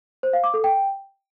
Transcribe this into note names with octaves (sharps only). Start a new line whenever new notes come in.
C5
F5
D6
A4
G5